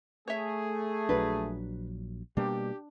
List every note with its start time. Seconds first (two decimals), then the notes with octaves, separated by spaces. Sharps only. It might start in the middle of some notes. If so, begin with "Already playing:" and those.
0.28 A3 G#4 C#5 E5
1.09 A#1 F#3 D4 B4
2.37 B2 G3 A#3 D4 G4